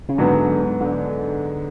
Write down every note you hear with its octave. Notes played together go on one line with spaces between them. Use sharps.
C#3
G#2 D3 F#3 B3
D3